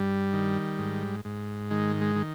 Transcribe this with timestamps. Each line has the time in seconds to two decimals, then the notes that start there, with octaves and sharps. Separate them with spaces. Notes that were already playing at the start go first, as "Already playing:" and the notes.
Already playing: G2 G3
0.33 D#3
0.79 G#2
1.25 G#2
1.71 D#3 G#3
2.01 G#3
2.16 D#3